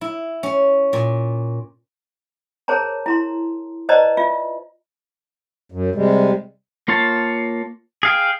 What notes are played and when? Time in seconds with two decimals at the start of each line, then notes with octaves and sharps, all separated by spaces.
0.01 E4
0.43 C#4
0.93 A#2
2.68 G#4 A#4 C5 C#5 A5 A#5
3.06 E4 A#5 C6
3.89 B4 C5 D5 D#5 A5 A#5
4.17 F4 E5
5.72 F#2
5.95 C3 G3 G#3
6.88 A#3 F4 C#5 A5
8.03 G#4 F5 G5